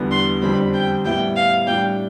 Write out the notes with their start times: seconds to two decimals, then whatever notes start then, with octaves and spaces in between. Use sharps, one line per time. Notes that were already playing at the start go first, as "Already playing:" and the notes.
Already playing: E2 D3 G3 B3
0.11 C6
0.42 F2 D3 G3 C4 B5
0.74 G5
1.04 A2 G3 B3 E4 G5
1.36 F5
1.66 A2 G3 D4 G5